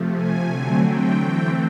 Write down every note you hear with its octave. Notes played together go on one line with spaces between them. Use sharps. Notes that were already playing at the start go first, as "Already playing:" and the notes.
Already playing: C3 F3 A3
G#5
D3 F#3 A3 C4
G5
E3 A3 C4